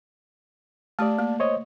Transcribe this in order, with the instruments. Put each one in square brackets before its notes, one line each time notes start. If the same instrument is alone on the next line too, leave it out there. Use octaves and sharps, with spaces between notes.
[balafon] A3 G4 [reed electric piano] D5 A5
[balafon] A#3
[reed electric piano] C5 C#5 D#5